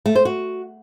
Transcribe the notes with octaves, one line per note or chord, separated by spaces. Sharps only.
A3
C5
F#4